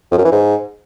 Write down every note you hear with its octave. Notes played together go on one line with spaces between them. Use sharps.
F2
F#2
E3
G#2